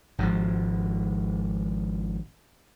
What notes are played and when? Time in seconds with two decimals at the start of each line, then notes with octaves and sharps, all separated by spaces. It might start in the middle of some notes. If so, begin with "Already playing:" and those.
0.18 G#1 G#2 F3